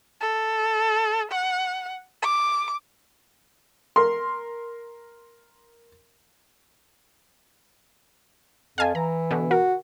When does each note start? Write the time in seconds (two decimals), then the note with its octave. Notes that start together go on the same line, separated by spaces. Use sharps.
0.21 A4
1.31 F#5
2.23 D6
3.96 A#4 C6
8.78 F2 F5 G#5 A5
8.95 E3 A#5
9.31 B2 D3
9.51 F#4 A#4